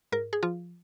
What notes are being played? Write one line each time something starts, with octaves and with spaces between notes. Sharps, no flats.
G#2 A#4
G#4
F3 F4